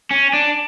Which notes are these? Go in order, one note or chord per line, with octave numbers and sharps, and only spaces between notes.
C#4
D4